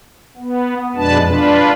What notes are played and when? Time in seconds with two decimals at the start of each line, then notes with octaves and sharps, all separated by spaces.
0.37 B3
0.96 F2 B2 G#3 D4 B4 A5
1.26 D4 F4 B4